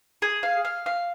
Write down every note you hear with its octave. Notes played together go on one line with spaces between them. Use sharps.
G#4
F5
F5
F5